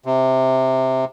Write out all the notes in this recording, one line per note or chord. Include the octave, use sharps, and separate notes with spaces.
C3